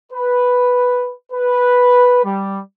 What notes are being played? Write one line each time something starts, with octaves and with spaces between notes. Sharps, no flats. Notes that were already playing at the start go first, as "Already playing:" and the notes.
B4
B4
G3